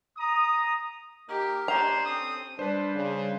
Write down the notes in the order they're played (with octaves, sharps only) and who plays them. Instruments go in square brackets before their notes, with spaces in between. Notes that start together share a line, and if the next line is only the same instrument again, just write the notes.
[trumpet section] A#5 D#6
[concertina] A#3 D#4 A#4 [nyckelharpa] G4
[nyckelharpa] C#4 D4 [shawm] C5 [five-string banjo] A#5
[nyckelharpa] C4 [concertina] C#4 A4 [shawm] D#6
[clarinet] G3 [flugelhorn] D4 [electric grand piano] B4 C5
[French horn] C#3